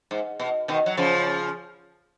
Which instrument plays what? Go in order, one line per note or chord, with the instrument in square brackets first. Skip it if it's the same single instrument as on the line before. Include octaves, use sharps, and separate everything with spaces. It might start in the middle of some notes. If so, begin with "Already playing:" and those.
[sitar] G#2
B2
B2 D#3
F#3
C#3 F3